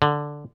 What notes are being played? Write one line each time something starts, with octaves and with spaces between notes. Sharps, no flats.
D3